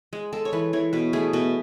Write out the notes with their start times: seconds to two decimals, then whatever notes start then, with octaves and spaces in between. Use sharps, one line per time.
0.13 G#3
0.33 G#3 A4
0.45 C#5
0.53 E3 B4
0.73 E3 C#5
0.93 B2 B4
1.13 A3 G#4
1.33 B2 B4